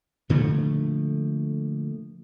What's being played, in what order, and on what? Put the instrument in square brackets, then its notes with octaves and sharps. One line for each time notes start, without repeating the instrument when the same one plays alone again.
[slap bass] A#2 D3 F3 A3